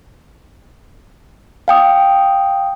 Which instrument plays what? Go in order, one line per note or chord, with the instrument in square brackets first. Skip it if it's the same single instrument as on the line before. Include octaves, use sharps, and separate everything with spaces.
[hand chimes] F5 G5 D#6